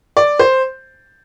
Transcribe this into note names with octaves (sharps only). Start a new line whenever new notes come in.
D5
C5